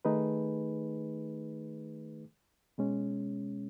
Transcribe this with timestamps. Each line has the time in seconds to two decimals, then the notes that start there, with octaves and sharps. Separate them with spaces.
0.05 D#3 A3 D#4 G#4 B4
2.78 B2 G#3 C#4